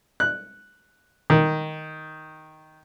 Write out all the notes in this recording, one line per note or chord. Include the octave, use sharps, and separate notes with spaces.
F#6
D#3